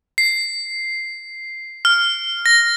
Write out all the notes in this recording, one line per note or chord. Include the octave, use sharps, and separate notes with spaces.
C7
F6
A#6